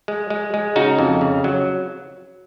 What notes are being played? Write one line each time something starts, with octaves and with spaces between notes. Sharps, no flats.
G#3
G#3
G#3
C#3 D#4 F#4
F2
C#3
F#3